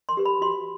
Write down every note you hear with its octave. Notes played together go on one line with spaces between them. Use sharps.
C6
G4 B4
B5
F#4 C6